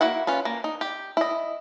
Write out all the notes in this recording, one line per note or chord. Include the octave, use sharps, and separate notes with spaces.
A#3 E4 F#4 F#5
C#4 F4 B4
A#3
D#4
G4
E4 D#5